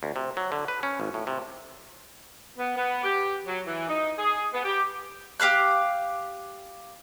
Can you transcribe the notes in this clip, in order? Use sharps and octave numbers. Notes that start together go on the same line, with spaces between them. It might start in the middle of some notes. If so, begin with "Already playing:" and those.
D2
C3
F#3
D3
B4
C#4
G#1
A2
C3
B3
B3
G4
F#3
E3
D#4
G#4
B3
G4
G4 F5 F6 F#6